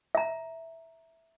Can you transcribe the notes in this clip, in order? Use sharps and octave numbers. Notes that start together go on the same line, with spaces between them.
E5 A#5